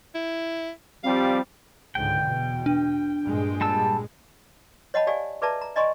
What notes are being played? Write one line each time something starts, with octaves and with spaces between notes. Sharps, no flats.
E4
F3 G3 C4 F5
C#2 G#2 D3 G5
E2 B2
D4
G2 A#2 G#3
G3 A5 E6
C#5 D#5 F#5 G5 A5 B5
G4 D5 F5 G#5
G#4 B4 D5 E5 A5 A#5
A#5
D5 D#5 G#5 A#5 C6 C#6